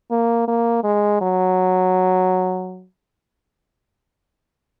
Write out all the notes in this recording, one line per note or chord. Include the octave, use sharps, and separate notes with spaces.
A#3
A#3
G#3
F#3